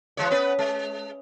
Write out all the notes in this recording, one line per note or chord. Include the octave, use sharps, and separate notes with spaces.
E3 G#3 C#5
B3 C#4 B4
G#3